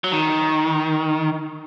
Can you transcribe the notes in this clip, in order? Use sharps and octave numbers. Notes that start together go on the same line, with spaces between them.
F#3
D#3